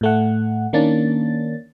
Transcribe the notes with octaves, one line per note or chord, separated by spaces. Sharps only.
A2 A3 F#5
D#3 A#3 C#4 D4 A6